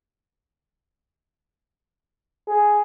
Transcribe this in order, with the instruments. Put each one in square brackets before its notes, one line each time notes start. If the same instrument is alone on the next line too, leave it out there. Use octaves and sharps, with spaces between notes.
[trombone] G#4